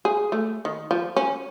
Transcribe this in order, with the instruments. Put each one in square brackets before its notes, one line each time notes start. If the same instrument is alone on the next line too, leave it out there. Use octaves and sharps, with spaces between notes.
[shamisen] G#4
A3
D#3
F3
C#4